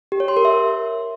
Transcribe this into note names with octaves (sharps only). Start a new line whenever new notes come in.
G4
C#5
C6
A#4
E5